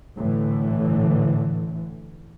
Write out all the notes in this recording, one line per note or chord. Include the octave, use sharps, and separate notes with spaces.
A2 D3 E3